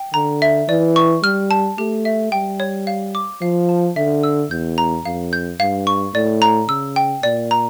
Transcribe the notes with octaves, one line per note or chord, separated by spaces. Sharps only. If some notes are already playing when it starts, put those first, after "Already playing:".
Already playing: G5
D3 A#5
E5
E3 D5
C#6
G3 F6
A5
A3 G4
E5
G3 G5
C#5
F5
D6
F3 F5
A5
D3 E5
E6
E2 G6
A#5
F2 F5
G6
G2 F5
C#6
A2 D5
A#5
C#3 E6
G5
A#2 D5
A#5